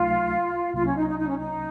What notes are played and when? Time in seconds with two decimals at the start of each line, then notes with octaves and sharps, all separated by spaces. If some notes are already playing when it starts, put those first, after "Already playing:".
Already playing: C#2 C3 F#3 A3 D#4 F4
0.74 C2 C3 F#3 A#3 F4
0.85 C#4
0.95 D#4
1.07 D#4
1.18 D#4
1.28 C#4
1.37 D#4